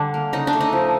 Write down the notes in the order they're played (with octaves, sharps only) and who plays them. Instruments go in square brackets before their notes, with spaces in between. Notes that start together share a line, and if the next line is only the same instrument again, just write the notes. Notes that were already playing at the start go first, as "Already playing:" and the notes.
Already playing: [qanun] D3 G3 D4
A#3
C#3 D#4
D4
A3
D#4
F3